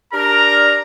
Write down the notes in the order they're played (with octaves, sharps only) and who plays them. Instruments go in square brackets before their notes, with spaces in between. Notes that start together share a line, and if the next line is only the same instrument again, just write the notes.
[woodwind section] D4 G4 A#4 [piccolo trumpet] A#5